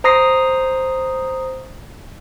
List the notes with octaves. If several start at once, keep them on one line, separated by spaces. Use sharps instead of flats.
C5 A#5 D#6 A#6 C7